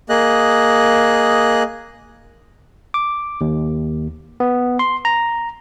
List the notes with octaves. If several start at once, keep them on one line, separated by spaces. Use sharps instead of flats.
A#3 G#4 D#5 F#6
D6
D#2
B3
C6
A#5